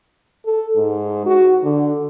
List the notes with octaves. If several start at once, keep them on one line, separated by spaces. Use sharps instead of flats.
A4
G#2
F#4
D3